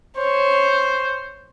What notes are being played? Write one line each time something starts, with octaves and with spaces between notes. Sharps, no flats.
C5 C#5